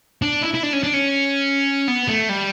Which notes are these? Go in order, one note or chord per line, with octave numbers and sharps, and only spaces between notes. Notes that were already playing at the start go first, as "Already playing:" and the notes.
D4
E4
E4
D4
C#4
D4
C#4
B3
A3
G3